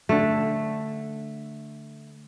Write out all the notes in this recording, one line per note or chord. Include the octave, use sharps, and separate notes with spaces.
D3 A3